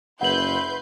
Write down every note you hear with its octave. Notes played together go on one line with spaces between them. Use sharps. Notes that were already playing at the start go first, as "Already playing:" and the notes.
F#1 E4 B4 F#5 C6 G6 F#7